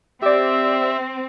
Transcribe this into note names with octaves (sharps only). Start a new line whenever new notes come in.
C4 G4 D5 E5